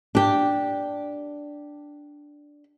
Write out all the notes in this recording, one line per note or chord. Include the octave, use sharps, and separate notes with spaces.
D4 G4